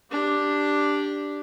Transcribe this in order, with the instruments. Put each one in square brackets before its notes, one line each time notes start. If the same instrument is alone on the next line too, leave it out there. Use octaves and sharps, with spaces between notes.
[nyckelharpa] D4 G4